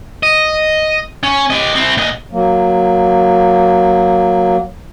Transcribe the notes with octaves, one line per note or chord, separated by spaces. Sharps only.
D#5
C#4
G4 D#5
C4 E4
A#2 D#5
F#3 A#3